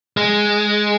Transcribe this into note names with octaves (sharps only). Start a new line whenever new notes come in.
G#3